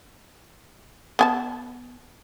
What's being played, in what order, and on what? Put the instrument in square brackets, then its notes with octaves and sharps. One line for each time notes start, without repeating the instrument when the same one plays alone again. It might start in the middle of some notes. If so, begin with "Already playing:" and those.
[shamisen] B3 G#5 A5